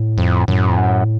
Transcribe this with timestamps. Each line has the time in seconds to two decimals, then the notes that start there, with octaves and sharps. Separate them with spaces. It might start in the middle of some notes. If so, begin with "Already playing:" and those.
Already playing: A2
0.18 F2
0.48 F#2 A2
0.69 F2
0.77 F#2